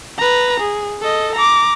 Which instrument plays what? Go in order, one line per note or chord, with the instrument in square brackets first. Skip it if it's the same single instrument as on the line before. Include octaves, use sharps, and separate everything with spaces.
[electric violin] B4 A#5
G#4
A4 D#5
A#5 D6